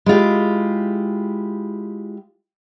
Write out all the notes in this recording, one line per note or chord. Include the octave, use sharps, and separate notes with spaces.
G#3 E4 F4 G4